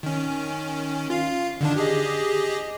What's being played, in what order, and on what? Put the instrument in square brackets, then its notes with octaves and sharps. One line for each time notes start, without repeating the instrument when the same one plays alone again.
[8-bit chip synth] D#3 C#4
F4 F5
D3 D#3 D4
G4 G#4 D#5